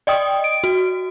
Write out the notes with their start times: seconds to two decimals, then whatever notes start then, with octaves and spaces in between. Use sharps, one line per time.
0.07 D5 D#5 G5 D#6
0.44 D7
0.64 F#4